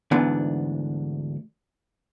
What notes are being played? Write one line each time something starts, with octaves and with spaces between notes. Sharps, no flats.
D2 G#2 E3 B3 D4